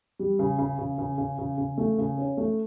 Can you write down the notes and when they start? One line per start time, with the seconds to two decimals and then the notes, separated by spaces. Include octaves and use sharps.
0.19 G3
0.39 C#3
0.58 C#3
0.78 C#3
0.98 C#3
1.18 C#3
1.38 C#3
1.58 C#3
1.78 A3
1.98 C#3
2.18 C#4
2.37 A3